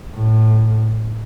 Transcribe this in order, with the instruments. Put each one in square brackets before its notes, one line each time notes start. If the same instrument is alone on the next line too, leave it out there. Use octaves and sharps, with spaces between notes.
[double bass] A2